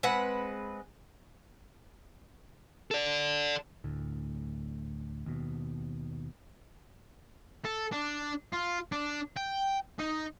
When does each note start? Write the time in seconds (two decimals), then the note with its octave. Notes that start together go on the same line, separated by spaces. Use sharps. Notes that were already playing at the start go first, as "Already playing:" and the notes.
0.03 G#3 C4 B4 F#5
2.91 A4 D5
3.84 D2 A2
5.26 D#2 B2
7.65 A4
7.92 D4
8.53 F4
8.92 D4
9.37 G5
9.99 D#4